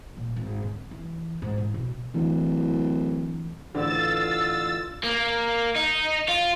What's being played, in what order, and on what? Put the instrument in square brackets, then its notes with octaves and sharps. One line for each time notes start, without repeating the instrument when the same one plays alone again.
[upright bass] A#2
G#1
D3
E3
G#2
A1
B2
[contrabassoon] D1 [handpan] E3
[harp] A1 [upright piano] D3 [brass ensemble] F4 [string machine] E6 A6
[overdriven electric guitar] A#3
D#4
F4